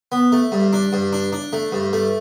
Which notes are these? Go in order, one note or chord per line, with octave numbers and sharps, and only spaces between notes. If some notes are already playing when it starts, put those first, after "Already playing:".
B3
A3
G2
D4
G2
D4
D4
A3
G2
A3